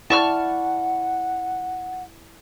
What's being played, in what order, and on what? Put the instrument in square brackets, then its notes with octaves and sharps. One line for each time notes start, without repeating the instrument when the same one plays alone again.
[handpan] E4 D5 [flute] F#5 [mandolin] A5 C#6 F6